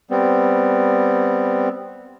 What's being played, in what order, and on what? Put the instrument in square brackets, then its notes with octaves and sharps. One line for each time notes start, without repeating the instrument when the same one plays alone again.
[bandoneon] G3 B3 C4